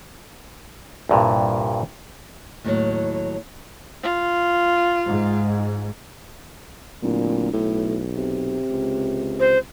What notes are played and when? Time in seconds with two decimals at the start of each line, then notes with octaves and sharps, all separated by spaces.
1.09 C2 G2 A#2
2.64 D#2 A2 F#3
4.03 F4
5.07 G#2
7.03 D1 A#2
7.53 B1 A2
8.16 C3
8.70 C#2
9.40 C5